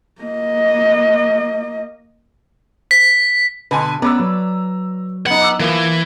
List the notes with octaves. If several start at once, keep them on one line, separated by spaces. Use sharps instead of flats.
A#3 D#5
B6
B2 D3 B4 G#5 C6
B3 C#4 B4 D5 A#5 E6
F#3
B3 D#4 F#5
D6 E6
E3 F3 A#3